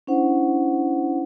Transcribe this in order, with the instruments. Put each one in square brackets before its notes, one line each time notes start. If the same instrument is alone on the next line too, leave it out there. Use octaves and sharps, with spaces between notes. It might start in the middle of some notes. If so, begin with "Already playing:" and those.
[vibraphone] C#4 D4 E4 C5 F#5